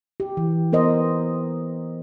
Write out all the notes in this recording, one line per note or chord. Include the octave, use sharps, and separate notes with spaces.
G4
E3
B3 A#4 C5 D#5